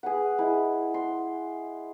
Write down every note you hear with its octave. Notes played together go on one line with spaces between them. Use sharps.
G#4 B4 F#5
G#3 E4
C6